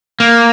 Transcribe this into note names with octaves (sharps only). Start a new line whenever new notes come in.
A#3